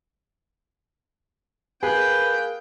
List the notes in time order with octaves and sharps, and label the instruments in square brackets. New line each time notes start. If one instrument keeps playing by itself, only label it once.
[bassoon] A#3 [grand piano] G#4 [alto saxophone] B4 [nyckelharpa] G5